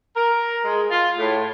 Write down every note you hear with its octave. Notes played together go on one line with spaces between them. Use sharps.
A#4
G#3
F4
A2